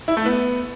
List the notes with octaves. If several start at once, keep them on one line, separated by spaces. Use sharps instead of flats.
E4
A3
B3